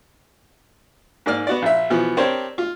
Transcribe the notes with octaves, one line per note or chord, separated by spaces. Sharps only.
G#2 A#3 D5 F6
B3 F#4 D5
A#1 E5
B2 E3 F3 B3
C4 D4 G4 A#4 C5 C#5
F4